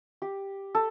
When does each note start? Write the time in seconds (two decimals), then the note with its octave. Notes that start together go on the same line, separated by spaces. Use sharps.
0.22 G4
0.75 A4